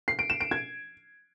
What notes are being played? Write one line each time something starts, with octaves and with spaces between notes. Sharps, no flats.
C7
D7
E7
D7
G#6